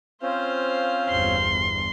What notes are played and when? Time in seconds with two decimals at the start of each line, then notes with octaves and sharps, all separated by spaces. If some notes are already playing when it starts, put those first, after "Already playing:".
0.22 C4 C#4 F4 C5 F5
1.09 G1 E2 C6